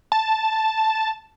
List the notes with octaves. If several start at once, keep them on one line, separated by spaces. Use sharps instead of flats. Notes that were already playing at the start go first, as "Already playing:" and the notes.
A5